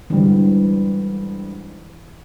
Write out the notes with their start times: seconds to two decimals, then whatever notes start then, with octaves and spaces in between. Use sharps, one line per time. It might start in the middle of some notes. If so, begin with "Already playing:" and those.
0.10 G#2 D3 E3 G3